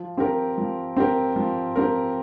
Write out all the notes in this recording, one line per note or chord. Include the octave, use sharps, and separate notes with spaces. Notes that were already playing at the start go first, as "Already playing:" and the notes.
Already playing: F3
C4 G4 A#4
F3
C4 G4 A#4
F3
C4 G4 A#4